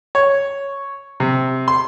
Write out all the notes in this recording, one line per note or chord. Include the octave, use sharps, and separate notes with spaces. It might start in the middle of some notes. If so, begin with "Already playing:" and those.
C#5
C3
C6